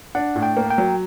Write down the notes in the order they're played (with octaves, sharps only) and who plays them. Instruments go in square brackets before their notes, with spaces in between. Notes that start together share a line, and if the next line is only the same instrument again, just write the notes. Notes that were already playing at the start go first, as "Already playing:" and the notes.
[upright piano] D4 [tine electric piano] F#5
[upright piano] A2
[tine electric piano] G5
[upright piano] A#3
[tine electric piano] G5
[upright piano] F#3